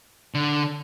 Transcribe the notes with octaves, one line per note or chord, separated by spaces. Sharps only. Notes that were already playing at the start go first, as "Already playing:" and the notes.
D3